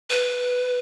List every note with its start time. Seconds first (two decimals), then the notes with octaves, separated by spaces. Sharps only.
0.10 B4